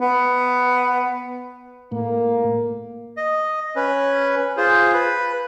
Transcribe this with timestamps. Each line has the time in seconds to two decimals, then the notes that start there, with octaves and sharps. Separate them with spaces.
0.01 B3
1.92 A2 A#3
3.17 D#5
3.76 C#4 B4
4.57 F4 G#4 C5
4.94 B4